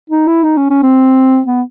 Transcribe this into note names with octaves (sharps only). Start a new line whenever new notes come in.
D#4
E4
D#4
C#4
C#4
C4
B3